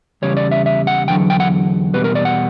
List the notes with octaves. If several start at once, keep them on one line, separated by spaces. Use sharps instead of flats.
E2 C#3 G3 C#5
D5
E5
E5
F#5
E2 D3 F#3 G5
G5
F#5
E2 B2 G3 B4
A#4
D5
F#5